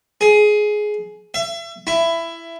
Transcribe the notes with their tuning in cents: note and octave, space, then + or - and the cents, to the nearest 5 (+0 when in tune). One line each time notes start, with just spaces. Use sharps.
G#4 +15
E5 +35
E4 +15